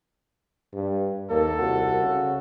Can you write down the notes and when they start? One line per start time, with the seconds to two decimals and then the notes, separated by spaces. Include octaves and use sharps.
0.74 G2
1.30 D#2 A#3 A4
1.59 C2 F#4
2.02 C#3